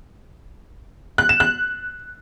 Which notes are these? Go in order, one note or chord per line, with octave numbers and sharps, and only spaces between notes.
F#6
E7
F#6